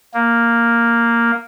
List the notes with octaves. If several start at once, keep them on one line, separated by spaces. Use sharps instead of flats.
A#3